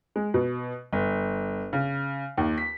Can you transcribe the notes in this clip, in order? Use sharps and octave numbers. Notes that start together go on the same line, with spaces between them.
G#3
B2
G1
C#3
D#2
B6